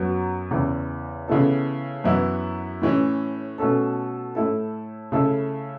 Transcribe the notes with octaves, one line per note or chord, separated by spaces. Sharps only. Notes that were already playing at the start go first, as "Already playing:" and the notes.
Already playing: F#2 F#3 B3
E2 C#3 E3
C#3 E3 B3 E4 A4
F#2 E3 B3 E4
A2 E3 C#4
B2 A3 C#4 A4
A2 A3 E4 A4
C#3 A3 E4 A4